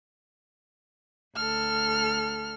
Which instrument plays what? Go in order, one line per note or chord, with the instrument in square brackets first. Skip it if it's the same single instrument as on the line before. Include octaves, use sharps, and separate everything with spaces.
[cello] D2 A4 [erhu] F6